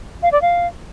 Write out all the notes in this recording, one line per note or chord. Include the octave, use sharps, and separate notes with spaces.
F5
D5
F5